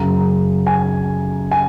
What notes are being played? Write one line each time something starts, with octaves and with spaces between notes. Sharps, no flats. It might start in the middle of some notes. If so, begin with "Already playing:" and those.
Already playing: F#2 C#3 A#5
G#5
G#5